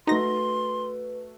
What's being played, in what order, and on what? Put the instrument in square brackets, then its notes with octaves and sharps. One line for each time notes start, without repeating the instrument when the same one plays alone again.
[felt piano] A3 F#4 [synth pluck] D#4 A#6 [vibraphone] B4 [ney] C6